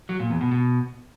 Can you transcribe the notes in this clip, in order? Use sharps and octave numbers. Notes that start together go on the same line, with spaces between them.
F#3
A#2
E2
B2
B2